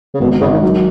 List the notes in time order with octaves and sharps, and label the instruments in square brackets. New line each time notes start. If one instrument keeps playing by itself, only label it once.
[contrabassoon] C#3
[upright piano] G#1 [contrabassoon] B2
[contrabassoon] B2
[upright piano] G#1 [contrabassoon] C#3
[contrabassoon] D#3
[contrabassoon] D#3 [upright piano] F#3